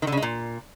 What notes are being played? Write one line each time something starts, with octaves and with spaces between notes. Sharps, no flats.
D#3
D3
C#3
G#3
A#2